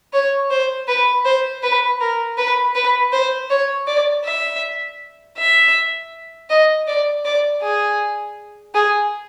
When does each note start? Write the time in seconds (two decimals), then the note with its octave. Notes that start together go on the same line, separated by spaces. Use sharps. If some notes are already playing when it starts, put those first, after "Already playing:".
0.13 C#5
0.50 C5
0.88 B4
1.25 C5
1.63 B4
2.00 A#4
2.38 B4
2.75 B4
3.13 C5
3.50 C#5
3.87 D5
4.25 E5
5.38 E5
6.50 D#5
6.87 D5
7.25 D5
7.62 G#4
8.75 G#4